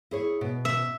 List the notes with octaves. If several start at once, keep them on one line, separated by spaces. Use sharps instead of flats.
E4 G#4 C#5
B2
E5